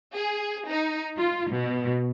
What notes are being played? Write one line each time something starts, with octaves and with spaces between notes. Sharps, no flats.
G#4
D#4
F4
B2